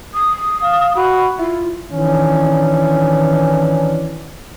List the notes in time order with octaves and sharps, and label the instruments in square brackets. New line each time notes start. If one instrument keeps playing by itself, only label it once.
[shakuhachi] D#6
[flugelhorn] F5
[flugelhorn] F#4 [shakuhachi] B5
[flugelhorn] E4 [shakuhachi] F4
[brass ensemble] D#3 E3 C#4 D4